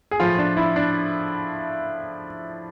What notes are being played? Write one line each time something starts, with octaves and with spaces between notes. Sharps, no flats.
G#4
A2 F3 F4
D4
E4
D4